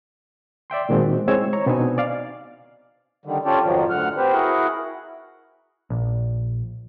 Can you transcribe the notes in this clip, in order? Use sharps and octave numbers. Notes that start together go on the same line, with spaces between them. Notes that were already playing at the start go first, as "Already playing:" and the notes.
D5 E5 G5 C6
A#2 D#3 G#3 C4 F#4
G#3 C4 E4 C#5 E6 G#6
C#5 A#5 C#6
B2 B3 C4 D4 D#4 G#5
D5 F5
D3 D#3 G3
C#4 F4 G4 A4 D5
F2 G#2 D#3 F3 F#3
D2 D3 F#5 F6
C4 G4 B4 C5
E4 F#4 G#4 A#4 F#5
A#1